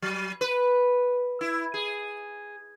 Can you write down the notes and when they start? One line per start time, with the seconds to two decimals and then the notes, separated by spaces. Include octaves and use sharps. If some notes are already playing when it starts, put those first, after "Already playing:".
0.02 F#3
0.41 B4
1.41 E4
1.74 G#4